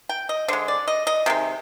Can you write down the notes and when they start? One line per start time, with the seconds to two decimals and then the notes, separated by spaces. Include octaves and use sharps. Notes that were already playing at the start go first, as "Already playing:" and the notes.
0.09 G5
0.29 D#5
0.48 D3 G#3 C5
0.68 D5
0.87 D#5
1.07 D#5
1.26 C3 D#3 G#3